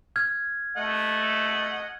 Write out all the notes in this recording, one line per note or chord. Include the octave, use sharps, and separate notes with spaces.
F6 G#6
A3 D#5 F#5